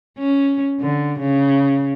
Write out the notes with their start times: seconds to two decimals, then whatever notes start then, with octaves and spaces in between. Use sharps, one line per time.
0.18 C#4
0.80 D3
1.20 C#3